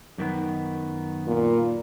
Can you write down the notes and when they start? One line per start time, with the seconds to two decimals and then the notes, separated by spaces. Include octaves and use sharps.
0.18 F#2 D#3 B3
1.27 A#2